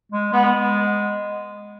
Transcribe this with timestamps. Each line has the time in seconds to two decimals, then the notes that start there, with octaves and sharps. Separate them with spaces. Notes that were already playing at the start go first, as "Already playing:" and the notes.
0.12 G#3
0.33 G#3 B3